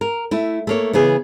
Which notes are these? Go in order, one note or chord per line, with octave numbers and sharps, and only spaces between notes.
A#4
A3 E4
A3 A#3 C#5
C#3 E3 B3 G#4